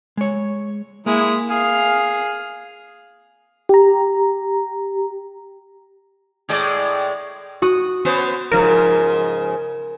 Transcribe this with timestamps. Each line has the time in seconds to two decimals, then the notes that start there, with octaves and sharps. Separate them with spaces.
0.17 G#3 C#5
1.06 G#3 A#3 E4
1.51 G#4 F5
3.69 G4 A#5
6.49 A2 G#3 D5
7.62 F#4 D#6
8.05 B3 C#4 C5
8.52 G#2 C#3 F3 A#4